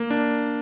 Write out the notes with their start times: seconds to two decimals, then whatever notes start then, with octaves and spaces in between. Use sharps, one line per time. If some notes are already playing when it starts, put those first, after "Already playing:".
Already playing: A#3
0.10 D4